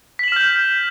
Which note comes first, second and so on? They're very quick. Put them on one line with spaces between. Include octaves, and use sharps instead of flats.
B6 F#7 E7 F6 G6